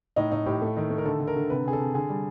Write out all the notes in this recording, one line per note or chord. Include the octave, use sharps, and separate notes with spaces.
A2 D#4
A2 D#4
A2 G4
A3
D#3
A3
A#4
D3 A4
D3
A#4
D3
C3 B4
C3 G#4
A4
C3
D3 G#4
G3